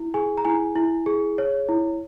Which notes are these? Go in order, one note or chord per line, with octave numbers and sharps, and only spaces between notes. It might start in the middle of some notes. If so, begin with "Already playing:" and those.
Already playing: E4
G#4 G#5
A#5
E4 G#5
E4
G#4
C#5
E4